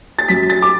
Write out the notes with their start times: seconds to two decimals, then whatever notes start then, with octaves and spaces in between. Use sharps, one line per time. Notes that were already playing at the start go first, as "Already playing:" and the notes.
0.19 A6
0.28 F#2 B6
0.50 A6
0.62 D6